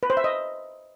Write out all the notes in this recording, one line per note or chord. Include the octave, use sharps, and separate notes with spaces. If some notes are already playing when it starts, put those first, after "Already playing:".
B4
C5
E5
D#5